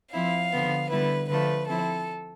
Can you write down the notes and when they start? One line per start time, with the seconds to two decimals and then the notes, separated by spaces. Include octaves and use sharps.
0.14 F3 C4 E4 F5
0.53 D3 F3 B3
0.91 D3 G3 B3 E4 B4
1.29 D3 F3 A3 B4
1.68 F3 C4 E4 A4